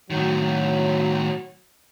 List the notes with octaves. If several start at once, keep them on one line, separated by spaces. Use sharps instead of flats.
A2 D#3 F#3